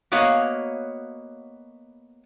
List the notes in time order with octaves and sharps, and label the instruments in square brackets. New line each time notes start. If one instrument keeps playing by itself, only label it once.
[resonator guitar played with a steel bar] A#3 B3 F#4 C#5 D#5 F5